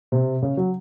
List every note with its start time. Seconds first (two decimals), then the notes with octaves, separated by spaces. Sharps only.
0.12 C3
0.42 C#3
0.57 F#3